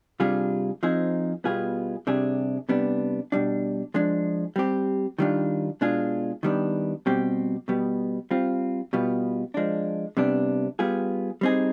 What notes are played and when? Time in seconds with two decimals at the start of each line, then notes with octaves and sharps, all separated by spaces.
0.20 C3 G3 D4 F4 G#4
0.83 F3 C4 D#4 G#4
1.44 B2 G3 B3 F4 G#4
2.07 C3 G3 D4 G#4
2.69 C3 G3 B3 D4
3.32 B2 G3 D4
3.94 F3 G#3 D4
4.56 G3 C4 G4
5.18 D#3 G3 D4 F4
5.81 B2 G#3 D4 F4 G#4
6.43 D#3 G3 B3 D4
7.06 B2 G3 C4 G4
7.68 B2 G3 B3
8.31 G3 C4 F4
8.93 B2 G3 B3 F4
9.54 F3 G#3 D4
10.17 C3 G3 B3 D4
10.79 G3 B3 F4 G#4
11.41 G3 C4 D#4 G#4